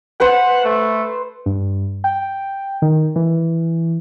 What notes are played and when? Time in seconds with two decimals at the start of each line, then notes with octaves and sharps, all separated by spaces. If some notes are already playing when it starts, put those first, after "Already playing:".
0.20 B4 C5 F#5
0.64 A3
1.46 G2
2.04 G5
2.82 D#3
3.16 E3